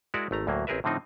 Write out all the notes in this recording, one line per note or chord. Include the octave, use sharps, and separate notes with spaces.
G#3 E4 F#4 A#4 D5
G#1 A3 A#5
D2 A2 F#3 A#3
A1 C4 G#4 A#4 B4 E5
A2 D3 F3 C4 D#4